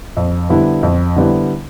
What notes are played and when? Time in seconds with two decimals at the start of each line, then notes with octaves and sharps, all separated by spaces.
0.17 F2
0.49 D3 G3 B3 E4
0.83 F2
1.16 D3 G3 B3 E4